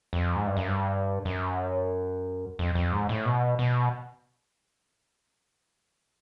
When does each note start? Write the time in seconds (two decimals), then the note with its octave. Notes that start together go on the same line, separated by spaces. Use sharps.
0.13 F2
0.36 G#2
0.46 G2
0.57 F#2
0.67 G2
1.25 F#2
2.59 F2
2.75 F2
2.92 G#2
3.09 A2
3.25 B2
3.59 B2